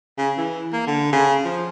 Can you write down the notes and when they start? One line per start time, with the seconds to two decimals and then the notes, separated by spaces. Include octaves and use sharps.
0.18 C#3
0.38 E3
0.73 A#3
0.87 D3
1.13 C#3
1.45 F3